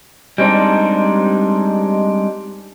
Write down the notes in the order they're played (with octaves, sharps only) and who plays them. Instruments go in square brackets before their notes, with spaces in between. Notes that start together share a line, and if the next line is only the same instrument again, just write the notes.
[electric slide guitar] G3 G#3 C4 D4 D#4